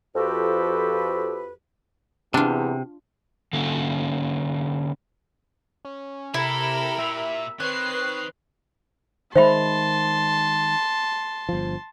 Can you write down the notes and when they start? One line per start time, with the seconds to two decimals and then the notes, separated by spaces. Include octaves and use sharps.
0.15 F2 F3 F#4 G4 A4 B4
2.34 E2 C3 D4 F4
3.53 D3 A#3 C#4 A4
5.85 C#4
6.34 C3 E4 G4 A4 A#4 B5
6.99 A#2 E5
7.60 D#3 C4 B4 C#5 F#6 C7
9.35 D#3 G#3 C5 E5 A5 B5 C6
11.49 G1 F3